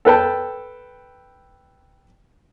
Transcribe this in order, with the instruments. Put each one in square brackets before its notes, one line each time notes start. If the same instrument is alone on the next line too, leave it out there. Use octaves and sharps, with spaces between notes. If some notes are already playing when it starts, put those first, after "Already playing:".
[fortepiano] A4 B4 G5 A5